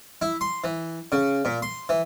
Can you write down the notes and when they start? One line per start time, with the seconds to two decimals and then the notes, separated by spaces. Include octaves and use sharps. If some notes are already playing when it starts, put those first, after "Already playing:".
0.22 E4
0.41 C6
0.64 E3
1.12 C#3
1.45 A#2
1.62 C6
1.89 E3